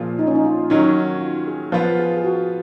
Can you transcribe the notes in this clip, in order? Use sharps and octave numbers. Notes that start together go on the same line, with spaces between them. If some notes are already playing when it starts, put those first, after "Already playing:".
Already playing: A#2 F3 A#3 F4 G#4
D#4
C#4
D#4
F4
D#3 F#3 C#4 D#4
F4
G#4
F3 B3 F4 B4
G#4
G#4
F#4